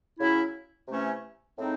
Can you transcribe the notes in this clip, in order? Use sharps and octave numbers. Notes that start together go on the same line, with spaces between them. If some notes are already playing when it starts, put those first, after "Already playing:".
C#3 F#3 C#4 E4
C3 E3 A3 C#4
A2 G#3 C4 D#4